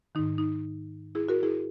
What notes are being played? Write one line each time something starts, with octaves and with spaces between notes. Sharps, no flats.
G#2 D#3 D#4
D#4
E4 G#4
F#4 A#4
E4 G#4